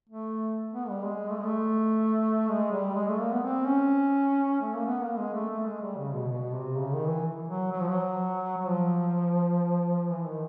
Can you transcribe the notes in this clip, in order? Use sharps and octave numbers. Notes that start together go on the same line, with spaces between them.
A3
B3
G3
G#3
A3
G#3
A3
G#3
G3
G#3
A3
A#3
B3
C4
C#4
A3
A#3
B3
A#3
G#3
A3
A3
G#3
G3
C#3
B2
B2
C3
C#3
D#3
E3
F#3
F#3
F3
F#3
F#3
F3
E3
D#3